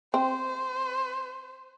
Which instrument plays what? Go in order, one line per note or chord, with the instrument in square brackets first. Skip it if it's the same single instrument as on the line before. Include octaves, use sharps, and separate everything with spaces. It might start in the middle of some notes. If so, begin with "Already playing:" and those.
[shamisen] C4 [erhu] C5